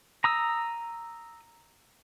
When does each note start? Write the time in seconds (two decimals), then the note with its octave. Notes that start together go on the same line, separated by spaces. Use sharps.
0.24 A#5 D#6 E6